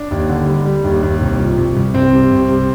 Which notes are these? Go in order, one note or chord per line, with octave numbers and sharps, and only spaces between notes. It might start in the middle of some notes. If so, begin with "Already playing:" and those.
Already playing: D4
D#2
D3
G3
G3
D#2
D#2
C2
F3
C2
C2
C2 C4
C3
C2
C3